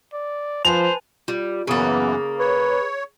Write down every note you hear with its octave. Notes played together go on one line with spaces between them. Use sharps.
D5
F3 B4 C5 G#5 A5 F7
G3 F4
F#2 C#3 E3 A#3 B3 G#4 D#6 A6
B4 C#5